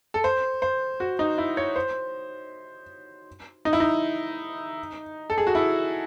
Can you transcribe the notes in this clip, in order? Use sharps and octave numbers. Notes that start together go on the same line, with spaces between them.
A4
C5
C5
F#4
D#4
E4
C#5
C5
D#4
E4
D#4
A4
G#4
F#4
E4